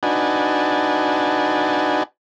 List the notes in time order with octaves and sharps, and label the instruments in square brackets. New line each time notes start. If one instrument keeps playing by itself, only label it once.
[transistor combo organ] D4 D#4 F#4 B4 G#5 A5